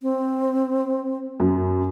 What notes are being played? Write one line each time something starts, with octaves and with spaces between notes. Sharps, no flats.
C4
F#2